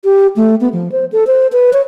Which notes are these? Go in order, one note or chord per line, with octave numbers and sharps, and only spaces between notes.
G4
A3
B3
F3
C5
A4
C5
B4
C#5